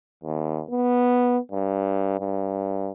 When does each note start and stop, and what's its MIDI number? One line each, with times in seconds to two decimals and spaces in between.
0.24 0.62 39
0.70 1.38 59
1.52 2.16 43
2.20 2.91 43